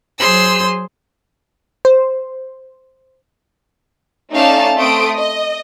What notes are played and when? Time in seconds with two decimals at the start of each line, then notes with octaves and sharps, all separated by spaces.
0.19 F#3 G#4 C5 C6 E6
1.85 C5
4.34 A3 C#4 D#4 D5 F5 A5
4.78 A3 C4 C6 D#6 D7
5.17 D#5